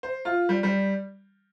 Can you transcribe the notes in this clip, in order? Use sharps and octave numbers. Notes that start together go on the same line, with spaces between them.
C5
F4
G3
G3